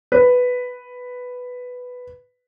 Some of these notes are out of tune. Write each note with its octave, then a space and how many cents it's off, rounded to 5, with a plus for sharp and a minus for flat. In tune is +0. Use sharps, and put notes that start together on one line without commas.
B4 +5